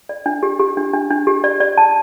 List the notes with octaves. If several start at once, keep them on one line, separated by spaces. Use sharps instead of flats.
D5
D4
G4
G4
D4
D4
D4
G4
D5
D5
A5